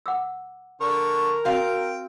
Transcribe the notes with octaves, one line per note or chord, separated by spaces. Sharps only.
F#5 D6 E6
D3 A#4 C#6
C4 F#4 F5 G5